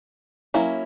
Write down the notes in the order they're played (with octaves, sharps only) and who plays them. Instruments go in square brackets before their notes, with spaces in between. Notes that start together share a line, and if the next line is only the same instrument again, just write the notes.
[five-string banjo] F#3 A#3 C#4 E4